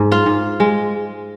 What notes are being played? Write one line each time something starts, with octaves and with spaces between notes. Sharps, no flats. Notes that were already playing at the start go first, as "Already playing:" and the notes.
Already playing: G#2
F4 F5
G#2
G#3